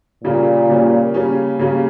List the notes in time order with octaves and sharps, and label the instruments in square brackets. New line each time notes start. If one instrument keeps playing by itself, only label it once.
[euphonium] A#2 [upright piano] C#3 G3 A#3 C#4
[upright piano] C#3 G3 A#3 C#4
C#3 G3 A#3 C#4
C#3 G3 A#3 C#4